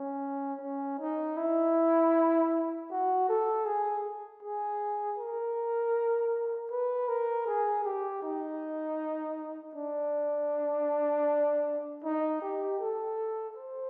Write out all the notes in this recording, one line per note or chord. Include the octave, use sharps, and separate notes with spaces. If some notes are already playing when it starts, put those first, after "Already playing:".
Already playing: C#4
C#4
D#4
E4
F#4
A4
G#4
G#4
A#4
B4
A#4
G#4
G4
D#4
D4
D#4
G4
A4
C5